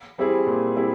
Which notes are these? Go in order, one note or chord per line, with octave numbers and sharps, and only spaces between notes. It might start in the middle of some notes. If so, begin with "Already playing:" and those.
G3 C4 E4 G#4
A#2
G3 C4 E4 G#4